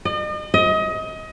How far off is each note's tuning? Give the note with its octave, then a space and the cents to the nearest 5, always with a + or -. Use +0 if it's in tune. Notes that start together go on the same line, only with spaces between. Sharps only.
D#5 -40
D#5 +25